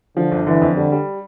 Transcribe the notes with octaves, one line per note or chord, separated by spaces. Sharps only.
D3 F3
G1
D3 E3
F2
D3 G3
G3